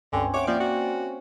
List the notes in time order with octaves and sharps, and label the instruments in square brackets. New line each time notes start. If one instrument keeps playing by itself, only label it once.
[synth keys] C#2 G2 [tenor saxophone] D3 [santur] C4 C#4
[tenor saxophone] C#5 [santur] E5 F#5 [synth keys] D6 D7
[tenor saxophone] F3 [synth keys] A#3 D5 [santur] F5
[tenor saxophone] F#4